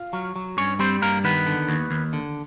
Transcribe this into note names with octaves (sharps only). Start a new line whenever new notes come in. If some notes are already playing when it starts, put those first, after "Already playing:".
Already playing: F4 F5
F#3
F#3
G2 C#4 C#5
G3 C4 C5
G2 A#3 A#4
D#3 B3 B4
D3
D#2
D#2
D3